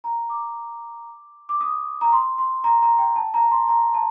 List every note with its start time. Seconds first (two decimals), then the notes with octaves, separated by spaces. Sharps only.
0.04 A#5
0.30 D6
1.49 D6
1.61 D#6
2.01 A#5
2.12 C6
2.38 C6
2.64 A#5
2.82 A#5
2.99 G5
3.16 A5
3.34 A#5
3.51 C6
3.68 A#5
3.94 A5